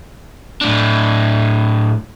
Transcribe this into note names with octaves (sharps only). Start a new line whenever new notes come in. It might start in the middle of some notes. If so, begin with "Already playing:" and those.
A2 D4